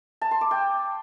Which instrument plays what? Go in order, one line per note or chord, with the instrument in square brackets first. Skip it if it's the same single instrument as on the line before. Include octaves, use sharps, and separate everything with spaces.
[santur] A5
C6
D6
G5